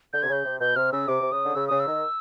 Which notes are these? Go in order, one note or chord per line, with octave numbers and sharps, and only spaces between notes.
D3 G6
C3 G#6
C#3 G6
C3
B2 G6
C3 F6
C#3 E6
C3 D6
C3
C#3 D#6
D3
C#3 E6
C#3 D#6
E6
D#3